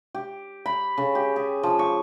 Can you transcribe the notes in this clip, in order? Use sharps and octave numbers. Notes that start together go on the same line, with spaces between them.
G4
B5
C#3
G4
G#4
F3
C#6